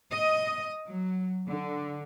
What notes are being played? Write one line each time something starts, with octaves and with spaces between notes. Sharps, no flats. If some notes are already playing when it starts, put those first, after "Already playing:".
D#5
F#3
D3